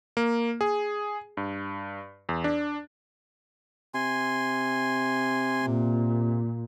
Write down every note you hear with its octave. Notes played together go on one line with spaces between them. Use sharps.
A#3
G#4
G2
E2
D4
C3 G#5 C6
A#2